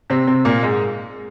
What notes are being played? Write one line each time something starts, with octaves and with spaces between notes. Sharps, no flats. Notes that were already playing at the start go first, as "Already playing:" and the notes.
C3 C4
C3 C4
A#2 A#3
G#2 G#3